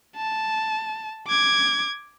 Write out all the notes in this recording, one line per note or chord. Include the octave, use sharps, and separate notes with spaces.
A5
D6 G#6